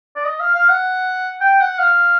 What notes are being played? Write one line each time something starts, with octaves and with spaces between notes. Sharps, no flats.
D5
D#5
F5
F5
F#5
G5
F#5
F5